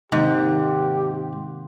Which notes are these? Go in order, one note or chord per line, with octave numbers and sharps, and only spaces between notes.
G#2 C3 D#3 A#3 G4